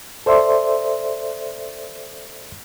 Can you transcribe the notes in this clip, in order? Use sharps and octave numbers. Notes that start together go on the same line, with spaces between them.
A4 C5 D5 E5 C6